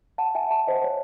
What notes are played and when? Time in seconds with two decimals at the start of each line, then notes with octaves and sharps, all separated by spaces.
0.18 F#5 A5
0.35 E5 G#5
0.51 F#5 A5
0.67 C5 D#5
0.80 C5
0.84 C#5